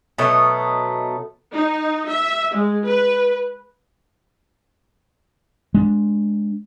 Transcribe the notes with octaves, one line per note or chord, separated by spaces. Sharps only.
B2 F#3 A3 D#4
D#4
E5
G#3
B4
G#3 D4